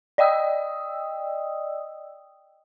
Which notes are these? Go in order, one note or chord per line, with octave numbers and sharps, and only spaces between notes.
D5 D#5 G5 D#6 E6